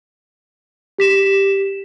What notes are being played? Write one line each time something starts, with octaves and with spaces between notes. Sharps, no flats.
G4 B6 E7